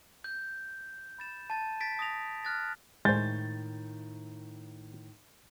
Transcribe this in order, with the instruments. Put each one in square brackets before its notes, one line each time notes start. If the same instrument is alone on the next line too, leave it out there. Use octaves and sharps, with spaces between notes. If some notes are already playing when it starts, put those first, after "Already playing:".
[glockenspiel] G6
B5 A6 E7
A5 A6
A6 B6 D7
A5 D#6 A#6 B6 F7
F6 F#6 A6 A#6
[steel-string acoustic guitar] A2 D#3 [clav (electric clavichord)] G#3 C5 [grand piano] G6 A6